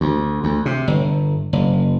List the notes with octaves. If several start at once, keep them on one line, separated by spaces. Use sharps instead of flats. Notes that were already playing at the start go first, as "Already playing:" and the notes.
D2
D2
C3
G1
F#1